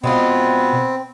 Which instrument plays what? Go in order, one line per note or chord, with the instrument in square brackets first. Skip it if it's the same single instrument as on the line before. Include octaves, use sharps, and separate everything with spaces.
[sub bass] B2 [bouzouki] G#3 D4 F4 [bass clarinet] B3 [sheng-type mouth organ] C4